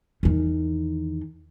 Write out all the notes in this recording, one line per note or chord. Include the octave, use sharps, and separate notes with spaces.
E2 D#3